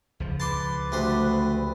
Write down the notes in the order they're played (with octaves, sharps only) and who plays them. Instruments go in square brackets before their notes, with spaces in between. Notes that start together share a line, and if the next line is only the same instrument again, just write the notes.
[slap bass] C#2 F3
[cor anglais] B4 [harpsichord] A5 C6 D6
[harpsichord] D2 G3 C5